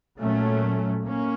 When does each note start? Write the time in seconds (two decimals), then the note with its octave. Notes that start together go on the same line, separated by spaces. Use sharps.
0.19 A#2 F#3 A3 C#4
1.05 A#3 C#4